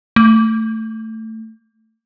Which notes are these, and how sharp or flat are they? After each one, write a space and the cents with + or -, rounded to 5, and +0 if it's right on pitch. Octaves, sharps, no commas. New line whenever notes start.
A3 +15